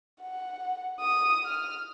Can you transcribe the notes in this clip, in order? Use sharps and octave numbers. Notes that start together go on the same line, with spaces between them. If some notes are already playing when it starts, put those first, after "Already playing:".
F#5
D#6
F6